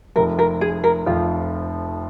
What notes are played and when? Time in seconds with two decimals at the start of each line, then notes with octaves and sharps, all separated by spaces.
0.16 F1 F2 F3 A#4
0.39 A#4
0.61 G#4
0.84 A#4
1.06 F1 F2 F3 F4